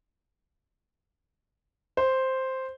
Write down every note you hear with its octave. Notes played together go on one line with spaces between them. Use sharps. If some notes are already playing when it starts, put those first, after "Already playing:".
C5